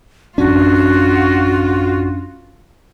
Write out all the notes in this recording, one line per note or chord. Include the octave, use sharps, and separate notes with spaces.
A1 F#2 C#4 D4 F4 F#4